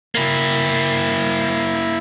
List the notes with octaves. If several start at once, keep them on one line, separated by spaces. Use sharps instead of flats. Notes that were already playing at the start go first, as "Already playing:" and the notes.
A#3 E4